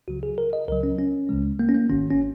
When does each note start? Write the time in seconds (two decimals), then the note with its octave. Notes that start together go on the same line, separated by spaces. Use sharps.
0.08 C#2 C#3 F#3 F#4
0.23 G#4
0.38 A#4
0.53 D#5
0.68 C#2 C#3 F#3 A#4
0.83 C#4
0.98 C#4
1.29 C#2 C#3 G#3
1.59 A#3
1.69 C#4
1.75 A#3
1.90 G#1 G#2 D#3 C#4
2.11 C#4